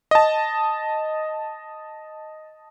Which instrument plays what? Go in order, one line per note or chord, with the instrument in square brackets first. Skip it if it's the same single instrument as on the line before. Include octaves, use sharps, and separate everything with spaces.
[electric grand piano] D#5 A5